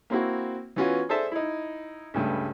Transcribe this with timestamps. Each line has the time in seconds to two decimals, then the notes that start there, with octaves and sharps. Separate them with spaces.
0.10 A#3 C4 E4 F#4
0.76 E3 B3 C#4 F4 F#4
1.09 G#4 A4 C5 D5 E5 A5
1.32 D#4 E4
2.14 C#2 G2 A3